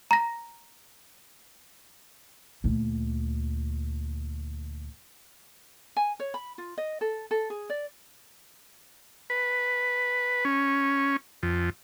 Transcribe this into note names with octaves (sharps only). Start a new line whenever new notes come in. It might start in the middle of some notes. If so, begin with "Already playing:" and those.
A#5 A#6
D2 A#2
G#5
C#5
B5
F4
D#5
A4
A4
G#4
D5
B4
C#4
F2